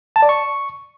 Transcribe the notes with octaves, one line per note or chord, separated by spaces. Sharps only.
A5
D5
C#6